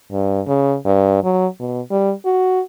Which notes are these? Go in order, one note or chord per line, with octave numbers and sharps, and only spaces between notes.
G2
C#3
G2
F#3
B2
G3
F#4